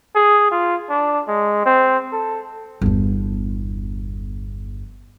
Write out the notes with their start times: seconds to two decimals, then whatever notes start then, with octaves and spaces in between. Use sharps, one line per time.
0.16 G#4
0.52 F4
0.90 D4
1.28 G#3
1.66 C4
2.13 A4
2.81 G1 E2